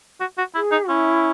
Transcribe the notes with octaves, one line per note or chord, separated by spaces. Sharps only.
F#4
F#4
E4 G#4
D#4
C#4 E4